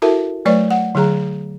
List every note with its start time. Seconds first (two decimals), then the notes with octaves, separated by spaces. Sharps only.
0.02 E4 F#4 A4 A#4 E5 A5
0.45 F#3 A3 B4 C#5 D5 C#6
0.71 F#5
0.95 D3 F#3 G#4 A#5